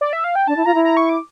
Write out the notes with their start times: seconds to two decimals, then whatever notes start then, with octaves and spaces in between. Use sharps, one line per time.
0.01 D5
0.13 E5
0.24 F5
0.35 G5
0.47 D4 A5
0.56 E4
0.66 F4 A#5
0.75 E4
0.84 A#5
0.97 C#6
1.09 D6